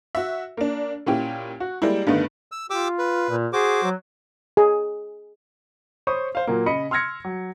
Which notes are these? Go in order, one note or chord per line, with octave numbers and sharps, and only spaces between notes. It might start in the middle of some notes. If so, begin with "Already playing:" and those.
F#4 E5
A#3 D4
A#2 C#4 E4 G4
F#4
G3 G#3 A#3 E4
G2 D3 D#3 A3 B3
E6
F4 G4 D6 E6
B4
A#2
F#4 G#4 C5 D6
F#3
G#4
C5 C#5 B5 C#6 D#6
C5 F5
A#2 F#3 A#3
C#3 D#5 B5 C#7
C6 E6 F6 G#6 A#6 C#7
F#3